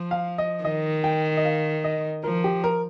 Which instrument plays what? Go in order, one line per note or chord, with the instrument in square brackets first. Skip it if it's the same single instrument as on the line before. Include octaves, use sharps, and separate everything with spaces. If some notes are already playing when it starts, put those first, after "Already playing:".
Already playing: [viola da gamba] F3
[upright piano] F5
D#5
[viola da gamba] D#3 [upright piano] D#5
[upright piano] G5
D#5
F5
D#5
[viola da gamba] F3 [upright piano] A#4
[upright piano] G4
A#4